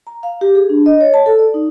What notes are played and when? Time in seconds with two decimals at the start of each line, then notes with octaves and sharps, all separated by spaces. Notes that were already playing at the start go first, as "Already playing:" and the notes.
0.07 A#5
0.23 F5
0.41 G4
0.55 G#4
0.69 D4
0.86 D#5
1.01 C#5
1.14 A5
1.26 A4
1.39 D5
1.54 D#4